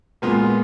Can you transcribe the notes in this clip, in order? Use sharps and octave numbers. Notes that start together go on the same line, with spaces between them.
A#2 G#3 B3 F4